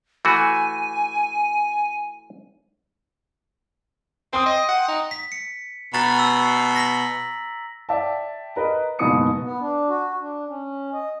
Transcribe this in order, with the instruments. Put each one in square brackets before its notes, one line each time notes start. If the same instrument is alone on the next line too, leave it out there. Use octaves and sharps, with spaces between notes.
[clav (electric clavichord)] E3 A3 F#4 [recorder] G#5
[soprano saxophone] C4 [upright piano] G5 C6 D#6
[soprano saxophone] D#5
F#5
D#4
[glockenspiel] B6
C#7
[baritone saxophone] B2 [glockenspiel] A#5 A6
[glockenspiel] E6
A#6 B6 F#7
[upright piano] D5 E5 G5 A5
A#4 B4 D#5
F#1 G#2 B2 B3 D#6 C#7
[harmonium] B3
D4
F#4
D4
C#4
D#5